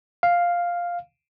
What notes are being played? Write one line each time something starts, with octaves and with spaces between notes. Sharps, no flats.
F5